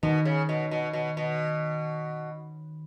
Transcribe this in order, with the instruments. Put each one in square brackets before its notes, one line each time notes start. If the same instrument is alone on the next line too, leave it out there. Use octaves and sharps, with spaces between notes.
[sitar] B2 [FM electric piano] D#3
[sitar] C#3
B2
B2
B2
B2